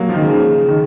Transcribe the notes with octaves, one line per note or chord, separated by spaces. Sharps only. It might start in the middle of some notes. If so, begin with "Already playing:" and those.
Already playing: F#3 A#3
F3
D#3
C#3
C#3
D#3